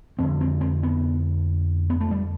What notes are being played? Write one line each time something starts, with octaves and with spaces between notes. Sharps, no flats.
F2 D3 C4
C4
C4
B3
B3
A3
G3